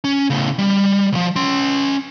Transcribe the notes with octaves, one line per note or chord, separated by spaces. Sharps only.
C#4
A2 C#3
G3
C2 F3
C#4 C6